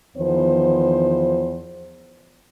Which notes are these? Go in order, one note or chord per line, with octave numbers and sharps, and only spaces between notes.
E2 D#3 F3 B3 C5